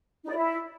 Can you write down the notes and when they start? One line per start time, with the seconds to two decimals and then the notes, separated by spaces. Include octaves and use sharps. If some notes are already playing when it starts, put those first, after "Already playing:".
0.24 D#4
0.29 D5
0.35 E4